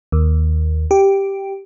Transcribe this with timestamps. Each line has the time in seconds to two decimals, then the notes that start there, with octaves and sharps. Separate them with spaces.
0.12 D#2
0.91 G4